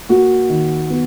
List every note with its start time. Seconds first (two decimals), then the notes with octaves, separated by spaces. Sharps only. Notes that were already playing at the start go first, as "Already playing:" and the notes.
0.09 A#3 F#4
0.49 D#3
0.90 B3